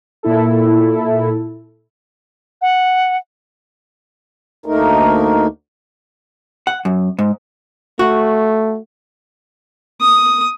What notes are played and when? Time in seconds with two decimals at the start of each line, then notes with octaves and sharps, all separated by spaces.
0.23 A#2 E4 A4
2.61 F#5
4.66 D2 A3 A#3 D#4 A#4
6.67 F#5
6.85 F#2
7.19 G#2
7.99 A3 F#4
10.01 D#6